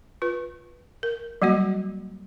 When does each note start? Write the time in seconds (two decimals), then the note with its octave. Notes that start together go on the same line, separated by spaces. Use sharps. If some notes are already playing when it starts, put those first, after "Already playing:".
0.22 F4 B4
1.03 A#4
1.42 F#3 G3 A#3 F#4 D#5